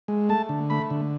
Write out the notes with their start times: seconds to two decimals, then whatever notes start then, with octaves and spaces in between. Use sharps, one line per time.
0.08 G#3
0.29 A3 A5
0.49 D3
0.70 A3 B5
0.90 D3